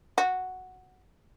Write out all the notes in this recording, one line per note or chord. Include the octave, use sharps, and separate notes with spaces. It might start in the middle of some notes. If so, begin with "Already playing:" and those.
F#4